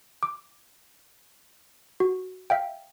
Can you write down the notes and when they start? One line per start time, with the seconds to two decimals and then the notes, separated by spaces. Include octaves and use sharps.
0.23 D6
2.00 F#4
2.50 E5 F5 G5